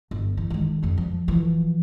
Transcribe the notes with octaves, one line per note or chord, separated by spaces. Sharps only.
G1
E3
D#3 G#3
F2 G3
F3
E3 F3